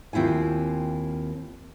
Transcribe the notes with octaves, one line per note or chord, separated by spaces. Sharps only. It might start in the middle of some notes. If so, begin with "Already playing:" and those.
D#2 C4 E4 F4 G#5